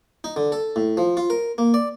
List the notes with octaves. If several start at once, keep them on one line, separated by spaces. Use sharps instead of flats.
D#4
D3
A4
A2
F3
F4
A#4
A#3
D5